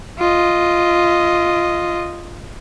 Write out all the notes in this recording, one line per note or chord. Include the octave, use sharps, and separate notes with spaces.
F4 D#5